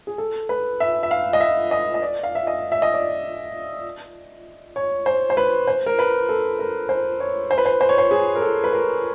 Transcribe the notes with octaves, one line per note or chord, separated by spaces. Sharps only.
G#4
A4
B4
E5
E5
F5
D#5
E5
D#5
D#5
D5
F5
E5
D#5
E5
D#5
D5
C#5
C5
C5
B4
C5
A#4
B4
A4
A#4
C5
C#5
C5
B4
C5
C5
C#5
C5
G#4
A#4
A4
B4
A#4